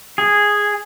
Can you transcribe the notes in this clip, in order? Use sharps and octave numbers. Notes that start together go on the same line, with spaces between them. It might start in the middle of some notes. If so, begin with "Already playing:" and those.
G#4